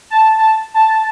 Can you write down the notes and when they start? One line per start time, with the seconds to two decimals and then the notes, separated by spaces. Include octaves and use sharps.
0.10 A5
0.38 A5
0.74 A5